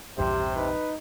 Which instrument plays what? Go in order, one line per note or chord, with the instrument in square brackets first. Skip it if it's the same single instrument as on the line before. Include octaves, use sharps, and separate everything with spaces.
[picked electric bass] A#1 E2 G2 [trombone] C3 [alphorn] G4 [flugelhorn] C5
[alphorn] D#4 [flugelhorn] B4